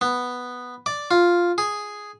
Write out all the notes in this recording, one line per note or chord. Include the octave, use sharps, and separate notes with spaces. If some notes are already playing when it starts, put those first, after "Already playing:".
B3
D5
F4
G#4